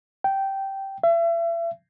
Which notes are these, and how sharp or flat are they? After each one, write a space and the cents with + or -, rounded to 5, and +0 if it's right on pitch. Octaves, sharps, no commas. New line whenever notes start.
G5 -10
E5 +35